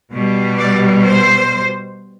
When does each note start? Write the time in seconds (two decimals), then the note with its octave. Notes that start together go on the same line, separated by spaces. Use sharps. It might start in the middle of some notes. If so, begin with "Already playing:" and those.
0.11 B2 G3
0.57 D5
1.04 C5